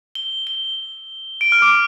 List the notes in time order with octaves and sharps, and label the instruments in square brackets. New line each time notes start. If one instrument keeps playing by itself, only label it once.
[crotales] G7
G7
D7
F6
D6